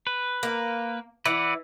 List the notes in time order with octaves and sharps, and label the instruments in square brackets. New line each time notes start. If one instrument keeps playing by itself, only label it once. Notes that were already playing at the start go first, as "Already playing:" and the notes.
[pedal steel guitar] B4
[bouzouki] A#3
[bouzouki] E3 [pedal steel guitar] B4 D5 F#5